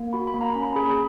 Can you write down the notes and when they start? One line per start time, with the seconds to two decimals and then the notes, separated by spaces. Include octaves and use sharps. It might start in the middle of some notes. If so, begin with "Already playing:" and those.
Already playing: A#3
0.13 F#4 B5
0.27 B5
0.34 A#3
0.41 A#5
0.54 C#4 B5
0.65 B5
0.76 G#4 B5
0.86 B5